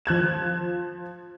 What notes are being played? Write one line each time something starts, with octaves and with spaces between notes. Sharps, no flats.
F3 F#6 G#6 E7